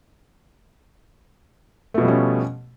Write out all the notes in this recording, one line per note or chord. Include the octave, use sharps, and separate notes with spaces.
B2 F3 G3 A3 C#4